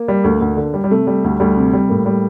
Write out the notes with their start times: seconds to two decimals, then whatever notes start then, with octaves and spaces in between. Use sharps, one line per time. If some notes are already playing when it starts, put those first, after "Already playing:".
Already playing: A#3
0.08 G3
0.24 D2
0.41 D2
0.57 D3
0.74 G3
0.84 G3
0.90 C3 A3
1.07 G3
1.24 D2
1.40 D2 G3
1.56 C3
1.73 G3
1.89 A2 A#3
2.06 G3